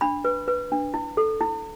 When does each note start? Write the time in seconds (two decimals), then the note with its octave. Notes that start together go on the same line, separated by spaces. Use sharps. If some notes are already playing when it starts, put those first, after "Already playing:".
0.01 D4 B5
0.25 B4
0.48 B4
0.72 D4
0.94 E4
1.17 A4
1.41 E4